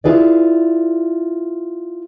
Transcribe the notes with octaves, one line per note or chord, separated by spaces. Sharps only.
E4 F4 G#4 B4 D5